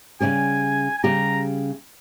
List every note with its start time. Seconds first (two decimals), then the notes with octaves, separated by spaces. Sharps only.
0.20 C#3 G3 C#4 G4 G#5
0.98 G#5
1.03 C#3 G3 C#4 G4 A#5